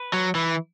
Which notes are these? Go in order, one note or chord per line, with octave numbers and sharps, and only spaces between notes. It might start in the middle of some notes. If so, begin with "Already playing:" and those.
Already playing: B4
F#3
E3